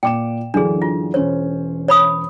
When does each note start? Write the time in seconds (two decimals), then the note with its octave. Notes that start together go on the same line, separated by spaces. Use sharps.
0.03 A#2 G5 D6 E7
0.54 F#2 D3 E3 D4 G#4
0.82 F4
1.14 E1 C#4 C5 C#5
1.88 C#5 B5 D#6